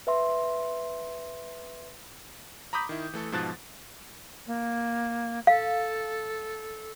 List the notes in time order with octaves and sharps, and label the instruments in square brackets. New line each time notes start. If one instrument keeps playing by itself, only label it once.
[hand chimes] B4 E5 C6
[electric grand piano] A#5 B5 D6 D#6 G6 B6
D#3 E4
E3 A3 A4
G#2 B2 F3 A5 F#6 A6
[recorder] A#3
[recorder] A4 [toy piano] F5